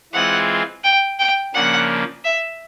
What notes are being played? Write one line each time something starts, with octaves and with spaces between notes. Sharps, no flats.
E3 G#3 C4 F4 G#4 F#5
G5
G5
C#3 F3 A#3 D4 F#5
E5